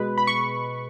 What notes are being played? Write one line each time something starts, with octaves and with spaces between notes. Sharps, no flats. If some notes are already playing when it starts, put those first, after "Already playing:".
Already playing: B2 G#3 B4
B5
C#6